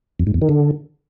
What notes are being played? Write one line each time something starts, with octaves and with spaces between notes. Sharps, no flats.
F2
G#2
E2
D#3
D3